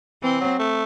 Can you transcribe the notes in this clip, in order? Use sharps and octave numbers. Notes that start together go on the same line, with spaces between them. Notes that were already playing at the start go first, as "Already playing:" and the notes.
E3 C4
F#3
A3